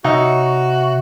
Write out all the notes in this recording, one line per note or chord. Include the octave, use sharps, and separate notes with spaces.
C3 D#4 F#4 C#5 E5